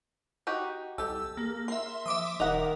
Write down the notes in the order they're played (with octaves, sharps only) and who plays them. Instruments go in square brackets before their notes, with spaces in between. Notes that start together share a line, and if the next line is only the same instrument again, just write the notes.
[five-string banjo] D#4 F#4 G4
[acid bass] C2 [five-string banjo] G4 A4 [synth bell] E6
[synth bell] A#3 [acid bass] G#4
[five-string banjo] A#4 [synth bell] E5 C6
[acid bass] F3 [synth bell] E5 D6 D#6
[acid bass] D#1 [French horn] D#3 [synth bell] A#4 [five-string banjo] D#5 F#5